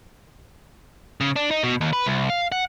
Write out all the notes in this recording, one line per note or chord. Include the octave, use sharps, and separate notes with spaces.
C#3
D4
D#4
B2
D#2
B4
C2
F5
F#5